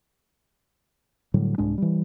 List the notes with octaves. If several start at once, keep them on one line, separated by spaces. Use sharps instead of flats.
A2 D3 F#3 G3
C2 G#2 G#3 D4
E3 G3